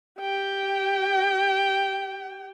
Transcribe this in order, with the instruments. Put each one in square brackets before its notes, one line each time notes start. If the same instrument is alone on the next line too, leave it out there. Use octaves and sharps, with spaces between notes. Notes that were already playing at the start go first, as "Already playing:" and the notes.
[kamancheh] G4 G5